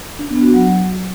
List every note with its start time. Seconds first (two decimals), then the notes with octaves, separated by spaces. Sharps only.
0.19 D4
0.31 B3
0.42 F#4
0.54 F#3